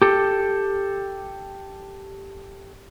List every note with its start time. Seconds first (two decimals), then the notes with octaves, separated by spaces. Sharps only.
0.02 G4 A4